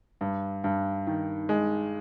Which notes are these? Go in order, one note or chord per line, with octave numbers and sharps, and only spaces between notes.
G2
G2
D#3
G#3